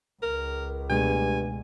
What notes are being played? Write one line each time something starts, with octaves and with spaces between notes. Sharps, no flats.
C#2 A#4
G2 B2 G#3 A3 G#5